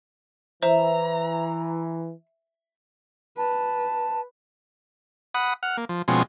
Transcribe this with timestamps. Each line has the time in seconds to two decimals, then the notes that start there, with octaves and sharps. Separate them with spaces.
0.63 E3 C5 E5 A#5
3.38 B4 A5
5.34 F#5 B5 D#6
5.63 F#5 F6
5.77 A#3
5.89 F3
6.08 B2 F3 G#3 C4 C#4